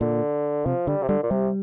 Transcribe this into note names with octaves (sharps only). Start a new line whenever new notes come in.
A#2 D3
C3 F3
D3 G3
C3
D3 G3
A#2
C3 G3